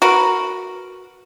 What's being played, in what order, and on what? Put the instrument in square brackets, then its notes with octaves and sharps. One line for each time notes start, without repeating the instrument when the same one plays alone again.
[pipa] F#4 A#4 B4